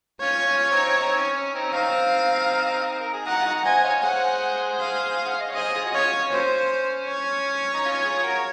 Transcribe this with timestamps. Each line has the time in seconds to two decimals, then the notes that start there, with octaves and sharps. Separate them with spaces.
0.21 C#4 F4 C#5
0.46 C#4 F4
0.63 C#4
0.72 C4 D#4
0.98 C4 D#4
1.17 C#4
1.36 C#4
1.55 C4 D#4
1.68 C#4
1.74 C4 D#4 F5
3.00 A#4
3.13 G#4
3.26 D#4 F#4 F#5
3.39 F4
3.46 D#4 F#4
3.65 C5 D#5 G#5
3.76 D#5
3.84 C#5 F5
4.03 G#4 C5 F#5
4.80 F5
5.26 F#5
5.33 F5
5.40 D#5
5.49 C#5
5.55 G#4 C5 D#5
5.75 F4 G#4
5.86 F#4
5.94 C#4 F4 C#5
6.13 C#4
6.32 F#3 A#3 C#4 C5
7.08 C#5
7.74 D#4
7.85 C#4 F4
8.04 F4 G#4
8.23 F#4 A#4